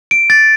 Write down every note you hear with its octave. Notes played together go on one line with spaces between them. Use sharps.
D7
A6